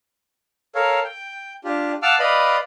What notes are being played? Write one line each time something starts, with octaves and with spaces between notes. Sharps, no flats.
A4 A#4 C#5 F5
G5
D4 F4 G4
F5 F#5 A5 D6 E6 F6
B4 D5 D#5 F5 B5